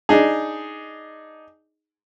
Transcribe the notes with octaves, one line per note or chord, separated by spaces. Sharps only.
D4 D#4 G#4